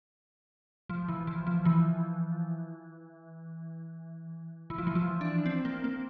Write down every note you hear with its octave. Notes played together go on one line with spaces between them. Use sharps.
F3
E3
F3
F3
E3
E3
F3
E3
F3
D4
C4
A#3
A#3